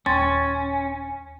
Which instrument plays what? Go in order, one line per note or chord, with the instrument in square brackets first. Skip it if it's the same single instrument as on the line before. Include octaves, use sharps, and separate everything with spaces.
[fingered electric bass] D#1 [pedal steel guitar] C#4 [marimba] G5 C6 A6